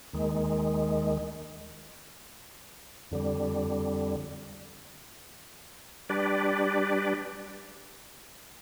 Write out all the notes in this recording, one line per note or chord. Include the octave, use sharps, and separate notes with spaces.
D#2 D#3 G#3
F2 D3 G3
G3 D4 G4 B4 D5